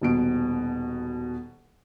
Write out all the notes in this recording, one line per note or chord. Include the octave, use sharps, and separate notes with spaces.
D#1 B2 D7